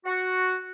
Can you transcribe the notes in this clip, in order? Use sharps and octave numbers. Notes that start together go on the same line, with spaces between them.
F#4